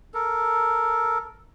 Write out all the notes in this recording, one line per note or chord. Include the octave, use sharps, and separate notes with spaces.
A4 A#4